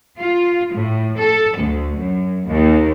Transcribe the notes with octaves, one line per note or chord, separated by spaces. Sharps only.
F4
A2
A4
D2
F#2
D#2